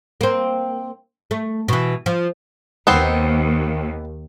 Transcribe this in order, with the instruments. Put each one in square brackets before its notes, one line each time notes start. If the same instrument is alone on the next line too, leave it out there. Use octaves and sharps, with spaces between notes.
[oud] A#3 C4
A3
B2 E3
F3
[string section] D#2 [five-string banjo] B3 C4 C5